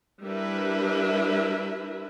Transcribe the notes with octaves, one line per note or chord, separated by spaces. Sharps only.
G3 D4 E4 A#4 B4 E5